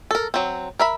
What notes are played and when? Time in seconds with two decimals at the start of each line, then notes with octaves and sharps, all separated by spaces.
0.11 A4 A#4
0.34 F#3 C4
0.79 A#4 E5 B5